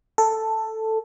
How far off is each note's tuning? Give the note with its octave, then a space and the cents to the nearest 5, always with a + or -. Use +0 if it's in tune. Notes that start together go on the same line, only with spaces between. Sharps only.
A4 +5